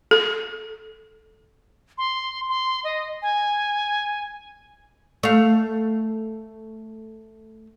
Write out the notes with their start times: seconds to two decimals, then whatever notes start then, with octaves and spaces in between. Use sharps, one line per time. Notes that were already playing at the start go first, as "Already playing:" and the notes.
0.11 A4
1.98 C6
2.49 C6
2.84 D#5
3.22 G#5
5.23 A3 F5